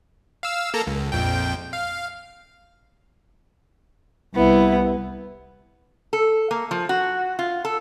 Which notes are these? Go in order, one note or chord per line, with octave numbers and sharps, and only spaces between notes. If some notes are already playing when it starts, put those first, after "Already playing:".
F5 E6
A#3 A4 A#5
C#2
A#1 F2 G5
F5
C2 B3 E4
A4
A#3
F3
F#4
F4
A4